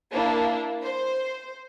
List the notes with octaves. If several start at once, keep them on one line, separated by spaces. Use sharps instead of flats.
A#3 D4 E4
C5